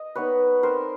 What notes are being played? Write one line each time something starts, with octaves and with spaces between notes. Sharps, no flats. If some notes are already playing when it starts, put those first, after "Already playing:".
Already playing: D#5
G3 B3 D#4 B4 C#5
G3 C4 D#4 A#4 C5